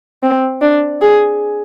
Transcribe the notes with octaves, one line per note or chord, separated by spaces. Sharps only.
C4
D4
G#4